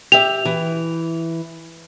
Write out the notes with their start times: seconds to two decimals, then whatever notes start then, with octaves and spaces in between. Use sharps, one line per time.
0.12 G4 E5 F7
0.45 E3